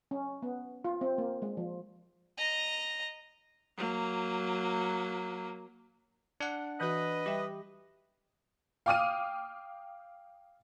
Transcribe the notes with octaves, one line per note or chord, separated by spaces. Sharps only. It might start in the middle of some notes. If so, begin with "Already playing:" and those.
C#4
B3
F4
C4
A#3
G#3
F3
D#5 A#5
F#3 A#3
D4 F#5
E3 F#4 B4 D#5
G3 G4 E5
F5 G5 D6 D#6 F6 D#7